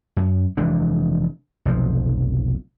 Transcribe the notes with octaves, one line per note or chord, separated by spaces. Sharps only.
F#2
F1 E3 G#3 D4
F1 B1 F3